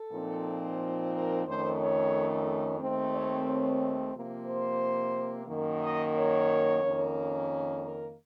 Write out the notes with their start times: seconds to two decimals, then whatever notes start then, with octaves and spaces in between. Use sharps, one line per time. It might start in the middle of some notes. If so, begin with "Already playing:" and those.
Already playing: A4
0.11 A#2 F3 C4 D#4
1.12 A#4
1.45 F2 D#3 A3 C#4 C5
1.79 C#5
2.79 D#2 D#3 A3 C4
3.13 C#5
3.46 C#5
4.14 C3 F3 A#3
4.46 C5
5.47 F#2 D#3 A#3
5.81 D#5
6.15 C#5
6.82 F2 D#3 A#3 C#4
7.82 A#4